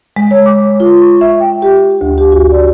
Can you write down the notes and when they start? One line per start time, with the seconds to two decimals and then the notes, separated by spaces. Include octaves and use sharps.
0.16 G#3
0.31 C#5
0.46 D6
0.80 F4
1.01 C#6
1.21 E5
1.40 G5
1.62 G4
2.01 D2
2.18 G4
2.32 F#4
2.51 D5